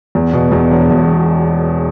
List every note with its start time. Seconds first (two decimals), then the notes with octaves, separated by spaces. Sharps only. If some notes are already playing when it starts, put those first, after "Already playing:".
0.15 E2
0.33 B2
0.52 E2
0.71 E1
0.90 E1